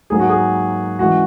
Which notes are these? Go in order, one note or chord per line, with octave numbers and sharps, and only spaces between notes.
G#2 F#3 A#3 G#4
F#4
G#4
C#3 E3 G#3 F#4